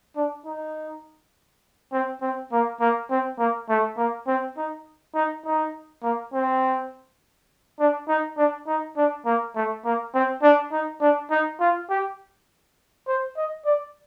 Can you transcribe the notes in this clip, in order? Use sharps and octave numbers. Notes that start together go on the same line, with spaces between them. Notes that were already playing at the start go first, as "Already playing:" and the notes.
D4
D#4
C4
C4
A#3
A#3
C4
A#3
A3
A#3
C4
D#4
D#4
D#4
A#3
C4
D4
D#4
D4
D#4
D4
A#3
A3
A#3
C4
D4
D#4
D4
D#4
F4
G4
C5
D#5
D5